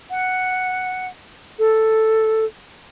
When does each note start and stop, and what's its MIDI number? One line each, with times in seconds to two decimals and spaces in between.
0.10 1.06 78
1.58 2.44 69